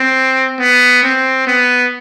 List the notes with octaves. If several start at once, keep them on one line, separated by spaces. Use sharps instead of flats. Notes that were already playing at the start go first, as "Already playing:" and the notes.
Already playing: C4
B3
C4
B3